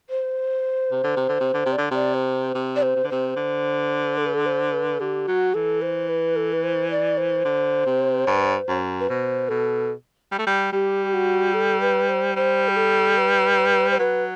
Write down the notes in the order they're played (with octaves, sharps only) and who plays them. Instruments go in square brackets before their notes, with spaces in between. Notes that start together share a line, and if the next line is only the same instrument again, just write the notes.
[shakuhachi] C5
[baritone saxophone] C3
D3
C3
D3
C3
D3
C3
[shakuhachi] D5
[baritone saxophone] D3
[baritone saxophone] C3 [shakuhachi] D5
[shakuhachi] C5
[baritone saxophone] C3
[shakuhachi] D5
C5
[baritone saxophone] C3
D3
[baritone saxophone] C3 [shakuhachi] C5
[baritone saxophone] D3
[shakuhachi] A4
B4
A4
C5
B4
[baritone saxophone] D3 [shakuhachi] G4
[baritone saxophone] F#3 [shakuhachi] F#4
[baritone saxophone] E3 [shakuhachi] A4
[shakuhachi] C5
B4
A4
B4
C5
D5
C5
[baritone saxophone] D3
C3
G2
F#2
[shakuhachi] B4
[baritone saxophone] B2 [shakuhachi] C5
[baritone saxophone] B2 [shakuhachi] A4
[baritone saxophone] G3
A3
G3
[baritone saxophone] G3 [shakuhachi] G4
[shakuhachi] F#4
A4
B4
C5
[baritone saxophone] G3 [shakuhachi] C5
[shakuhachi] G4
A4
B4
C5
[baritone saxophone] F#3 [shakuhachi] B4